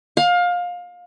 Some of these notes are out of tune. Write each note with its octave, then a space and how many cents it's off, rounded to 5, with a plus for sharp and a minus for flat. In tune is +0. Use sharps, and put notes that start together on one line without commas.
F5 +25